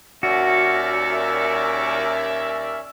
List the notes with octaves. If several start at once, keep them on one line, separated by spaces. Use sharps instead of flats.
D#2 C#4 F#4 A#4 D5 E5